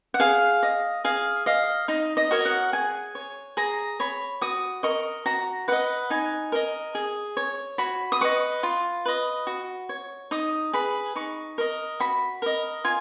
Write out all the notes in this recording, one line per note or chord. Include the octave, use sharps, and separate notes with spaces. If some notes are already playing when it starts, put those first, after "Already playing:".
F#5
G#4 F5
D#5
G#4 F5
D#5 F5
D#4 D#5
D#5
F#4 A#4 C#5
F#5
G#4 G#5
C#5
G#4 A#5
C#5 B5
F#4 D#6
A#4 D#5 C#6
F#4 A#5
B4 D#5 F#5
D#4 G#5
A#4 D#5
G#4
C#5
F#4 B5
D#6
B4 D#5 C#6
F4
B4 D#5
F#4
C#5
D#4 D#6
G#4 B4 B5
D#4 C#6
A#4 D#5
F#4 B5
A#4 D#5
F4 G#5